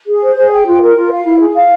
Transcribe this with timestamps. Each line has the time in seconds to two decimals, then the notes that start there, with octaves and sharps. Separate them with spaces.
0.07 G#4
0.21 C5
0.37 G#4
0.51 G5
0.66 F4
0.82 A#4
0.96 F4
1.11 F5
1.25 E4
1.40 G#4
1.55 F5